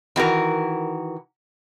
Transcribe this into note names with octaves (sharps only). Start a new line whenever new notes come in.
D#3 E3 F#4 A#4